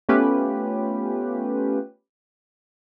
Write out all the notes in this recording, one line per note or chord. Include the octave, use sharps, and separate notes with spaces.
A3 B3 C#4 F4 G4 B4